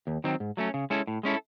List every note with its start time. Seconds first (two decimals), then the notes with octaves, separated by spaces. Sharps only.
0.07 D#2
0.24 D#3 F#3 C4
0.40 G#2
0.57 F#3 A3 C#4
0.74 C#3
0.90 G#3 C#4 E4 A4
1.07 A2
1.23 G#3 C#4 E4 A4